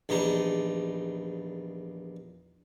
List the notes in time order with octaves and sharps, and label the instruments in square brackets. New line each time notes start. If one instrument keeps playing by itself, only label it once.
[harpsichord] A#1 E2 G3 D#4